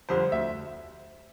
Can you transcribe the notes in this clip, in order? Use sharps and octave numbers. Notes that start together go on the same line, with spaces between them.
F2 D3 G3 C5
D2 E5